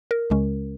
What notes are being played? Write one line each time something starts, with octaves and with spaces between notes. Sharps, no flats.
A#4
C#2 C#3 G#3 C#4